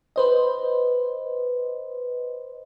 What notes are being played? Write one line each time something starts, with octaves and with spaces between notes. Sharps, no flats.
B4 C5 D#5